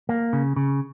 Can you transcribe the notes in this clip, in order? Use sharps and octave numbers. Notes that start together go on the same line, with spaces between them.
A#3
C#3
C#3